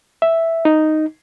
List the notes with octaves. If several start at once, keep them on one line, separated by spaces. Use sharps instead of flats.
E5
D#4